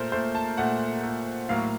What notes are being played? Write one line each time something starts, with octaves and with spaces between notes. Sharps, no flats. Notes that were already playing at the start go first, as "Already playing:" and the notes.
Already playing: A#2 A3 A#4 C5
A#2 A3 C5
A5
A#2 A3 F#5
A#2 A3
A2 F#3 A#3 F5